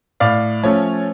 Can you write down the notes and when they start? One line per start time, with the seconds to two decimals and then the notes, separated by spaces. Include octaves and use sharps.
0.20 A2 D5 F5
0.63 F3 A3 C#4 C#5